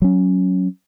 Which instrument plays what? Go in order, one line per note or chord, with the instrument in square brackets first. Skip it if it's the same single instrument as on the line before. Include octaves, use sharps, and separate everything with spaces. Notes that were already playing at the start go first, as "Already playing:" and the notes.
[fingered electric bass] F#3 C#4